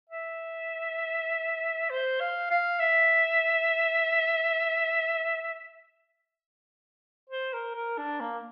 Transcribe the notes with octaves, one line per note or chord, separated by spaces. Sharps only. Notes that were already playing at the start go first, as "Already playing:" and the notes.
E5
C5
F5
F5
E5
C5
A#4
A#4
D4
A#3